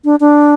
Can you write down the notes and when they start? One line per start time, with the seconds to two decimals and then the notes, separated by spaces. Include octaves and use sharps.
0.05 D4
0.20 D4